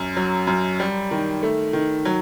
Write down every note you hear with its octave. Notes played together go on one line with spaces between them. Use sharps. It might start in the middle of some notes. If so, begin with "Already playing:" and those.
Already playing: F#2
F#3
F#2
G3
D#3
A3
D#3
F#3